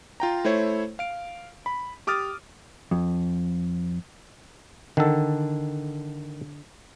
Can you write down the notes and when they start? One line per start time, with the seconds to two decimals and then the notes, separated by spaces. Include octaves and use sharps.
0.20 F4 G5 A#5
0.45 A3 E4 C5 C#5
0.99 F5 D7
1.66 B5
2.07 G4 D6 D#6 F6 A6
2.91 F2
4.97 D3 D#3 A4